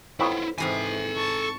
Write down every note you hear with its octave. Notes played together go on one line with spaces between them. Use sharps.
F2 F#3 B3 E4 F4
G#2 C3 E3 A4 G#5
A5 C#6